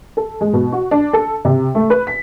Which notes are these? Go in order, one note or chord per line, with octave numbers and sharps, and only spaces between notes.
A4
G#3
B2
F#4
D4
A4
C3
A3
B4
B6